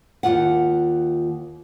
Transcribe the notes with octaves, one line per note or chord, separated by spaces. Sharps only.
D#2 D#3 F4 F#5